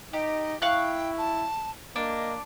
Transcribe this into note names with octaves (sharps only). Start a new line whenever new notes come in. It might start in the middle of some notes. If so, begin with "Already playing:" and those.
D#4 G4 D#5
E4 F5 G5 C#6 F#6
A5
A#3 D4 D#5